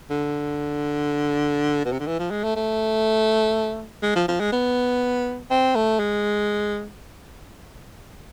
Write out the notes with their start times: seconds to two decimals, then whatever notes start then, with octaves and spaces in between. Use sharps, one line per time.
0.10 D3
1.85 B2
1.92 C3
2.00 D3
2.07 E3
2.19 F3
2.31 G#3
2.44 A3
2.56 A3
4.02 G#3
4.16 F3
4.28 F3
4.40 G#3
4.52 B3
5.50 C4
5.75 A3
5.99 G#3